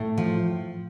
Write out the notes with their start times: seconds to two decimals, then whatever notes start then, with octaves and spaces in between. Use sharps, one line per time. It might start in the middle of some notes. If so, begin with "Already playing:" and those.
Already playing: A2
0.18 F3